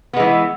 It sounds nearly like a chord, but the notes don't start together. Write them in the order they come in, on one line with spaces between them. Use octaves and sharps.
B3 G#3 E3